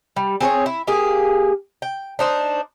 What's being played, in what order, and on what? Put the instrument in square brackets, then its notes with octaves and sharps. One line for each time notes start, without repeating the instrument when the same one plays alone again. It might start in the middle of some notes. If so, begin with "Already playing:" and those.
[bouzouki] G3
C4 G#4 C5 C#5
E4
A#3 G4 G#4
G5
D4 D#4 C5